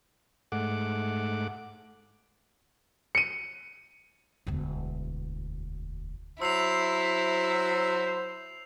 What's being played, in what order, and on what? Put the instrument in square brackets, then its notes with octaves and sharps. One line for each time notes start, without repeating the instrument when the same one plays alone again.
[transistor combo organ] G#2 A3 F#5 D6
[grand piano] C#7 D#7
[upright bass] E1 D2
[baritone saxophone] F#3 [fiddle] E4 [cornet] C5 [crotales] E6 C7 F7